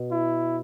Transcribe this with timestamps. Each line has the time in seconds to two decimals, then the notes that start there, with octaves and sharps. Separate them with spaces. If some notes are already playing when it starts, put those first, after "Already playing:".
Already playing: B2
0.11 E4